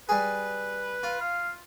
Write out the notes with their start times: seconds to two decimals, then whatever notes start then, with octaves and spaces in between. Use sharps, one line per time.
0.09 G3 G#4 B4
1.03 F4
1.20 F5